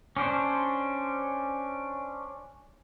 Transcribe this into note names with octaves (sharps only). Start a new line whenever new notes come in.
C#4 D4 C5